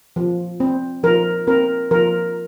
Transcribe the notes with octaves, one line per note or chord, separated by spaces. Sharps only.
F3
C4
F3 A#4
C4 A#4
F3 A#4